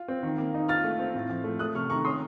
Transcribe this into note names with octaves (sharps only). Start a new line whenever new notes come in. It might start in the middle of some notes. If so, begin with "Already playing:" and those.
Already playing: F4
C4
D#3
A#3
D#4
F4 F6 A6
A3
C4
A2
F3
A3
A3 D#6 F#6
C3 C#6 F6
D#3 A#5 C#6
C#4 C6 D#6